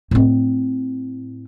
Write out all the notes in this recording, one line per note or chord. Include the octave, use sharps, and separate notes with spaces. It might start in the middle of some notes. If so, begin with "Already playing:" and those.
A2 C4